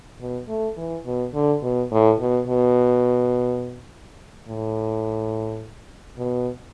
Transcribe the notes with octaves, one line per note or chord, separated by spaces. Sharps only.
B2
A3
E3
B2
D3
B2
A2
B2
B2
A2
B2